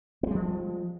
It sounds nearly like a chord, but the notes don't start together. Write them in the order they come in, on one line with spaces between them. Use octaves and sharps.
B3 G#3 G3 F3